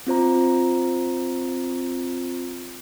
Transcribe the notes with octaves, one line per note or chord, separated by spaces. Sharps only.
C4 F4 C5 A#5